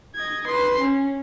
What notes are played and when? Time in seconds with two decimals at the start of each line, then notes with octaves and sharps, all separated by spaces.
0.16 D#5 G#6
0.47 B4 C6
0.80 C#4